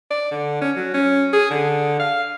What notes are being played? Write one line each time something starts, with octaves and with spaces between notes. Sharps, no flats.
D5
D3
C#4
F#3
C#4
G#4
D3
F5